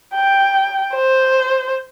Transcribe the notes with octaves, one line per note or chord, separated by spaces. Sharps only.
G5
C5